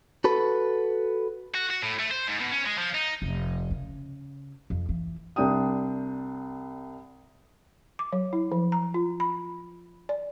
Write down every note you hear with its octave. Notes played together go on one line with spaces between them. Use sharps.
F#4 A4 B4
F#4
F#4
A2
A3
C5
G#2
B2
C#4
G#3
F3
D#4
F1
C#3
F2
E3
C2 D4 G5 D#6
D6
F#3
E4
F3
A#5
F4
B5
D5